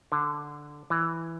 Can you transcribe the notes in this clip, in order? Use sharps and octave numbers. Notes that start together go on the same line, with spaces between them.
D3
E3